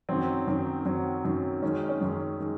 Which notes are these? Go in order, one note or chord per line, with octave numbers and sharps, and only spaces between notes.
F#2 D#3 F#3 C4
F#2 D#3 F#3
F#2 D#3 F#3 C4
F#2 D#3 F#3
F#2 D#3 G#3 C#4
C#4
F#2 D#3 G#3
D#3 G#3